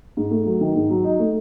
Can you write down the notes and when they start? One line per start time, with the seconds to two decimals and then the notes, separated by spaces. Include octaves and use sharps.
0.17 G#2
0.31 A3
0.46 F#3
0.61 D#3
0.75 G#2
0.90 F#3
1.04 D#4
1.19 A3